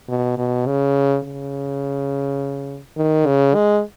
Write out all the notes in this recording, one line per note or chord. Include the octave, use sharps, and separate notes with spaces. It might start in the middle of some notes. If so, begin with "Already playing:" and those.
B2
B2
C#3
C#3
D#3
C#3
G#3